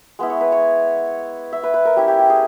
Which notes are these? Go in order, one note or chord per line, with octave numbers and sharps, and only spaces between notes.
G#3 B3 E4
C#5
B4
C#5
E5
B4
B4
A#4
G3 C#4 E4 G4
G4
G4
G#4